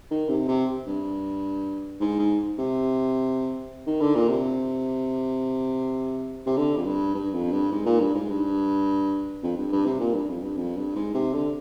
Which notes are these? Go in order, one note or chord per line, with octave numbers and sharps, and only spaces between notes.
D#3
C3
C3
G2
G#2
G#2
C3
D#3
D3
A#2
C3
C3
D3
F2
G2
G2
F2
G2
G#2
A#2
G2
G#2
G2
F2
G2
G2
C3
A#2
G2
F2
G2
F2
G2
G#2
C3
D3